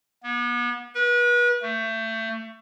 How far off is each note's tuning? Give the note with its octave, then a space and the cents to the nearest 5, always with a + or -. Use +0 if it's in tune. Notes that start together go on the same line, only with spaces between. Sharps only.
B3 -40
B4 -35
A3 +25